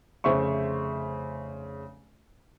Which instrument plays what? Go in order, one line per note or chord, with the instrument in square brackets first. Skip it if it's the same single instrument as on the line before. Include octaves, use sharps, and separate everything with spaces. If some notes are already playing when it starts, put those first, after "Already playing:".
[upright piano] F1 C#3 C5 E5 C#6